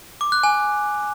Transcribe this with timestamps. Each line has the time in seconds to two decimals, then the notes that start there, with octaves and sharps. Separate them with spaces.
0.21 D6
0.32 F#6
0.43 G#5